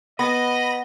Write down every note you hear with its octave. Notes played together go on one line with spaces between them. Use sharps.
B3 D#5 B5 A#6